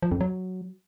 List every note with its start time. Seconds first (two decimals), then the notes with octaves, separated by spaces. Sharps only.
0.02 F3
0.12 F2
0.21 F#3